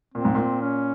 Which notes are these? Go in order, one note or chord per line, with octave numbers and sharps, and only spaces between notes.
A#2 C4
G#2
A#2
C#4